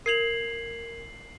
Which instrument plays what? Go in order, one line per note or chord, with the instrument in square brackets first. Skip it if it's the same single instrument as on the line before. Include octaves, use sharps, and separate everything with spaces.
[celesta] A#4 G#6 F7 [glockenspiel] C7 F#7